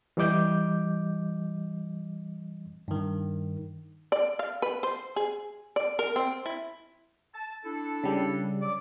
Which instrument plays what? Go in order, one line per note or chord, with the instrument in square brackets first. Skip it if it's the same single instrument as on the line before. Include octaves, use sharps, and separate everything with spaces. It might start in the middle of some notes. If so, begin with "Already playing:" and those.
[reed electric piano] E3 G3 D#5 D6 G6
[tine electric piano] G2 D#3
[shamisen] D5
F5
B4
C5
G#4
D5
A#4
C4
E4
[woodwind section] A5
D4 E4 A4
[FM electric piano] C#3 G3 G4
[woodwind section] F#3 D5 D6